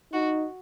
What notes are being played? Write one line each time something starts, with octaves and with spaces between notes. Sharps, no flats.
D#4 F#4